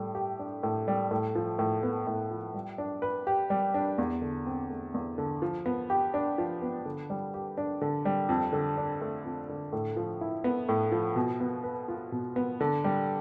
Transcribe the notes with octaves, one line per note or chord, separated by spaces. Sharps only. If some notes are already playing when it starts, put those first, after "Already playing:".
Already playing: A2 G3
G4
D4
A2
G3
A2
F3
A2
B3
A2
F3
G3
D4
B4
G4
G3
D4
E2
D3
C4
A3
E2
D3
F3
B3
G4
D4
F3
B3
D3
G3
G4
D4
D3
G3
F2
D3
D4
A3
F2
D3
A2
F3
E4
B3
A2
F3
B2
B3
B4
F4
B2
B3
D3
G3